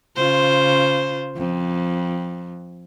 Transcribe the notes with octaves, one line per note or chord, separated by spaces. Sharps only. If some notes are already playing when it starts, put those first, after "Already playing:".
C#3 F4 C5
F2